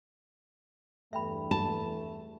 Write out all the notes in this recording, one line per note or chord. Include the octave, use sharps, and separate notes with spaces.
E2 G2 A3 E5 G5 B5
A5 B5